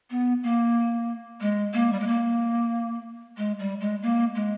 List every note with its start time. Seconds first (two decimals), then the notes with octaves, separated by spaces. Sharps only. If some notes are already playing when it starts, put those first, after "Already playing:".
0.10 B3
0.43 A#3
1.41 G#3
1.73 A#3
1.92 G3
2.00 G#3
2.07 A#3
3.37 G#3
3.59 G3
3.80 G#3
4.02 A#3
4.35 G#3